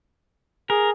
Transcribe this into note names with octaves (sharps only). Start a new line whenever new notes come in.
G#4 A#4